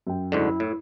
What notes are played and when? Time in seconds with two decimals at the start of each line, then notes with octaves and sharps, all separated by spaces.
0.07 F#2 G5
0.32 D2 G#2 D3 E4
0.60 A2